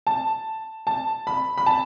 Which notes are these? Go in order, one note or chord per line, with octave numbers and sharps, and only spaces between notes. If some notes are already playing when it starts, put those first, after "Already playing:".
A5
A5
B5
B5
A5